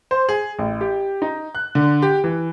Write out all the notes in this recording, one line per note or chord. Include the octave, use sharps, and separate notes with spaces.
C5
G#4
A1
G4
D#4
F#6
D3
G4
E3